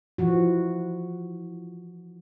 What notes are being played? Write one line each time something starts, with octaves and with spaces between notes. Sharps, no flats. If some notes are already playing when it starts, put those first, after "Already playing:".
E3 F3 F#4